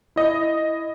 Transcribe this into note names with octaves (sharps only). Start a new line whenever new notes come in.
E4 D#5